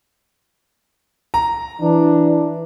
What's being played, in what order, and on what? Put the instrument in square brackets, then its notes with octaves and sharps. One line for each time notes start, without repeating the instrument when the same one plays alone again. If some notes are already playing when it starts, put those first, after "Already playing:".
[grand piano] A#5
[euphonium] E3 [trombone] D4